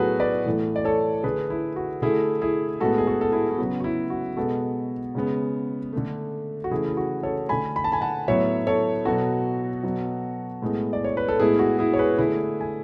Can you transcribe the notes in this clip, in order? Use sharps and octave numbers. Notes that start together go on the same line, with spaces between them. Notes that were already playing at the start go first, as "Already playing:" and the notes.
Already playing: A2 F#3 B3 F#4 G#4 A4 B4
B4 D5
A2 E3 A3
D5
A4 C#5
D3 A3 G#4 B4
E4
F#4
D3 A3 E4 G#4
E4 G#4
A2 G#3 B3 F#4 A4
G#4
F#4 A4
A4
E4 G#4
E4
C#3 F#3 B3 F#4
F#4
E4
F#4
B2 G#3 B3 F#4 A4
C#3 G#3 B3
D3 A3
F#4
C#3 E3 A3 E4 G#4
E4
F#4
A4 C#5
D3 A3 G#5 B5
B5
A5
G#5 B5
F#5 A5
A2 F#3 B3 C#5 E5
A4 C#5
B2 F#3 B3 F#4 A4
B2 F#3 B3
A2 G#3 B3
D5
C#5
B4
A4
A2 G#3 B3 E4 G#4
F#4
E4 G#4
C#5
G#4 B4
D3 A3 E4 G#4
G#5